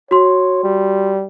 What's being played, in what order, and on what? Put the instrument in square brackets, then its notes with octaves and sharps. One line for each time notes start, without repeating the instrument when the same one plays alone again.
[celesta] F#4 C6 [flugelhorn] C#5
[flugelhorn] G3